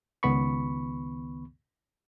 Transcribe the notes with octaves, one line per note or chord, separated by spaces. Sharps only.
C#2 D#3 B3 B5 C#6